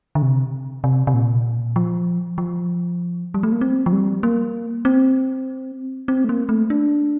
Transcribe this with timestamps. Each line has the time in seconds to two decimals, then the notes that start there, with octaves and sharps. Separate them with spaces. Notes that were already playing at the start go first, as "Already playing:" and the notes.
0.15 D3
0.22 C3
0.84 C3
1.07 C3
1.14 A#2
1.76 F3
2.38 F3
3.34 G3
3.43 A3
3.52 A#3
3.61 C4
3.86 F3
3.92 G3
4.23 A#3
4.85 C4
6.08 C4
6.24 A3
6.29 A#3
6.49 A3
6.70 D4